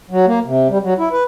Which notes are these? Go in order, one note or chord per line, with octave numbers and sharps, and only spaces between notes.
F#3
A#3
C3
G3
F#3
E4
B4